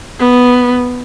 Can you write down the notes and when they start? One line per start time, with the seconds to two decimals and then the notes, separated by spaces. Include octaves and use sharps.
0.19 B3